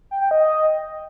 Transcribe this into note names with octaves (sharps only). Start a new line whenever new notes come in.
G5
G5
D#5